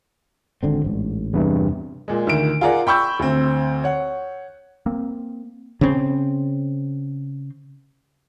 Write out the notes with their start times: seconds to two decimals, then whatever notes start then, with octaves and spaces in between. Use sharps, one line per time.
0.63 G#1 D3 C4
0.85 A1 G#2
1.33 E2 G2 C3
2.08 A#2 G#3
2.27 D2 D#3 D7
2.61 F4 G#4 A#4 D5 F#5
2.87 G5 B5 C#6 E6 G6
3.19 D2 C4
3.84 C#5 F#5
4.86 A#3 C4
5.81 C#3 C4